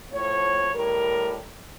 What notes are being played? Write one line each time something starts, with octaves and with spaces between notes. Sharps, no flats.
A2 F3 C#5
A2 G3 A#4